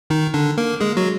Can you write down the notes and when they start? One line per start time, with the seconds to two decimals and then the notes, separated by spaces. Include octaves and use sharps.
0.10 D#3 D#4
0.34 D3 D4
0.58 A#3 A#4
0.81 G#3 G#4
0.97 F#3 F#4